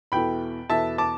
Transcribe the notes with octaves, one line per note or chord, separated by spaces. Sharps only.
E2 B2 B3 E4 A4 G5 B5
E2 B2 B3 E4 A4 E5 A5
A5 D6